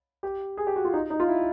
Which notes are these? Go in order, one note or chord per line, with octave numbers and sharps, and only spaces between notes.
G4
G#4
G4
F#4
F4
D#4
D#4
F4
E4